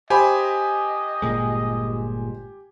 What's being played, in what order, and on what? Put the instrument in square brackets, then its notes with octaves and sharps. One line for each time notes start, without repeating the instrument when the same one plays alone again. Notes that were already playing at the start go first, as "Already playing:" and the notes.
[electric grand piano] G4 G#5 [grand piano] C5 B5 [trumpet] D#5
[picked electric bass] G1 A#2 G#3